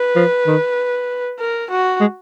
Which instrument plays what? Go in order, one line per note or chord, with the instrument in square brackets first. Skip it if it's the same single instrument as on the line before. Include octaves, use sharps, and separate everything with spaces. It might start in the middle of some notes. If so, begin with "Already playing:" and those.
Already playing: [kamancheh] B4
[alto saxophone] F3
D#3
[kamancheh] A#4
F#4
[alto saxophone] G#3